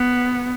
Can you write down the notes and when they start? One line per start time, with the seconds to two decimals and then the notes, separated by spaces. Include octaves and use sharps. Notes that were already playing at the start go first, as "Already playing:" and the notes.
Already playing: B3